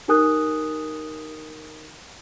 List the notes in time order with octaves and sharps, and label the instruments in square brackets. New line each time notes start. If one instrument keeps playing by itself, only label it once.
[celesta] D#4 G4 A#4 G#5 D#6 F#6